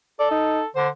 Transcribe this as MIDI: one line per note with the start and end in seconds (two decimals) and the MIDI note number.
0.20 0.67 69
0.20 0.28 74
0.31 0.61 63
0.76 0.88 50
0.76 0.89 72